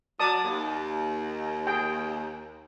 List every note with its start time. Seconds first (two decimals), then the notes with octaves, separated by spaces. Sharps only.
0.20 F#3 D5 A5 D#6
0.44 D#2
1.67 G#4 G5